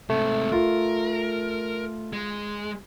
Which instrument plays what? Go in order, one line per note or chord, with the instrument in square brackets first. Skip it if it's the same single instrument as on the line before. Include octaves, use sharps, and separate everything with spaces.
[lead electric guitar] G#2 C3 [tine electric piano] A3
[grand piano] F4 [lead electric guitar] A#4
[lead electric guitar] G#3